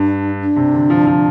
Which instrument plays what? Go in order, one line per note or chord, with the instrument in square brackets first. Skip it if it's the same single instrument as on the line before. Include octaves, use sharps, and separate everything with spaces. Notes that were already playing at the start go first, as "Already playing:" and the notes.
Already playing: [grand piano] G2 [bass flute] D4
[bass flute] D4
[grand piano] C3
D3
F3
F3